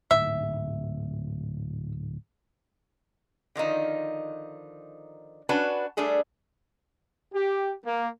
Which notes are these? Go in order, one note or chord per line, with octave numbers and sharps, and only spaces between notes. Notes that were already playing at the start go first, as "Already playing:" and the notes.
D1 G#2 E5
D3 D#3 F3 D#4
C#4 D4 F#4 B4 A5
G3 A3 D4 G#4 A4
G4
A#3